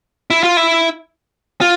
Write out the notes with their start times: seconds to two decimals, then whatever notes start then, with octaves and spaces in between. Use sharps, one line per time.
0.30 E4
0.43 F4
0.57 E4
1.61 F4